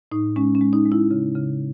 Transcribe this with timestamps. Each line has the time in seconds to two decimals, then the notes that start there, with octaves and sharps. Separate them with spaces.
0.11 A2 D#4
0.36 G#3 C#4
0.55 C#4
0.61 G#3
0.73 D#4
0.86 G#3
0.92 E4
1.11 C#3
1.35 C#3